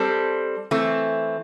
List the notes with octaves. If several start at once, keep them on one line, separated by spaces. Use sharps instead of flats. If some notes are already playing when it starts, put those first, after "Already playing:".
Already playing: G3 C4 A4 C5
E3 A3 C4